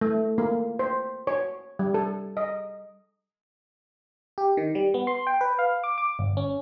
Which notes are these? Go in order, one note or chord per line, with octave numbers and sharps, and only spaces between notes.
A3
A#3
C5
C#5
G3
A4
D#5
G4
D#3
G3
B3
C6
G5
B4
F5
D6
D6
G1
C#4